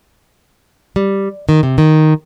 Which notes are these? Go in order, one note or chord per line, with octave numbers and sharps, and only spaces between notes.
G3
D#3
C3
D#3